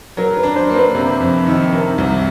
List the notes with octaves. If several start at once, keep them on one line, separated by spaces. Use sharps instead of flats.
F#3 A#4
B4
D4
C5
A#3
B4
C3
F2
D#3
C3 A#4
C2